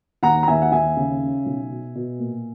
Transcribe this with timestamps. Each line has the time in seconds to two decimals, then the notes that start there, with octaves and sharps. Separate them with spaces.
0.23 D#2 F#5 A#5
0.43 A#5
0.48 D#2 E5 G#5
0.62 F#5
0.72 D#2 E5 G#5
0.97 C#3
1.22 C#4
1.46 B1
1.70 B2
1.95 B2
2.19 A#2